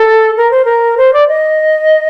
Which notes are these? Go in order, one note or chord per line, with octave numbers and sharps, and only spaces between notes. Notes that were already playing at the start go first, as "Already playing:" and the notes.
Already playing: A4
A#4
C5
A#4
C5
D5
D#5